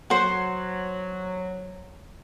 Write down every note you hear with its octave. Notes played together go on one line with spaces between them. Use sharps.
F#3 F#4 C5